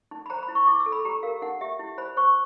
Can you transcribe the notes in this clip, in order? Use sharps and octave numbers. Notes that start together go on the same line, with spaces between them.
D#4
B5
C5 A#5
B5
E4
C#6
E4 D6
E6
A4
B5
G4 A#5
A#4 F5
D#4 F#5
G4 E5
E4
C5 B5
C5 C#6